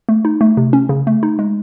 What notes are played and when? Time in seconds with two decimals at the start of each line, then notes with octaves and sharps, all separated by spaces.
0.09 A3
0.25 D#4
0.41 A3
0.57 C3
0.73 C#4
0.89 C#3
1.07 A3
1.23 D#4
1.39 G#3